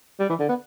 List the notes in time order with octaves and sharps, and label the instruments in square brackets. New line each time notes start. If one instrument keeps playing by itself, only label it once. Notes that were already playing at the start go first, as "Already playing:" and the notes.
[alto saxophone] G3
E3
D3
B3